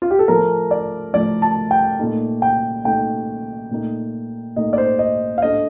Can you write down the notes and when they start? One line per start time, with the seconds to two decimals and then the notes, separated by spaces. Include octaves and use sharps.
0.02 F4
0.11 G4
0.19 A4
0.28 A2 F3 A3 A#4
0.71 D5
1.14 A2 F3 A3 D5
1.42 A5
1.71 G5
1.99 A#2 A3 D#4
2.42 G5
2.85 A#2 A3 D#4 G5
3.71 A#2 A3 D#4
4.56 A#2 A3 D#4 D#5
4.73 D5
4.78 C5
4.99 D#5
5.38 F5
5.42 A2 A3 D4 D#5